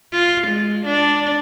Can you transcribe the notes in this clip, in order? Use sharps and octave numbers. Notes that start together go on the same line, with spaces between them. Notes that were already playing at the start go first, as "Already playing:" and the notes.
F4
G#3
D4